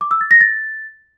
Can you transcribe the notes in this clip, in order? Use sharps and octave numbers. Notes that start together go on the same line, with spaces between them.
D6
E6
A6
A#6
A6